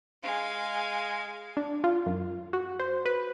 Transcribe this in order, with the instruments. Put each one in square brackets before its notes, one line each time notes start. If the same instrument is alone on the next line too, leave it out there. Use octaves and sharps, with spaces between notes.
[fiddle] G#3 F5
[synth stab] D4
F4
F#2
F#4
C5
B4